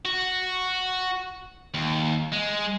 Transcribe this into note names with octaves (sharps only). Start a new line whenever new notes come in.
F#4
D#2
G#3